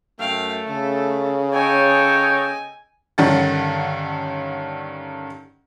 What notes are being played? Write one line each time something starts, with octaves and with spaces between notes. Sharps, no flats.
F#2 A3 F5 G5
C#3 A4
A4 C#5 D#5 G5 G#5
G2 D3 D#3 C#4 F#5 A6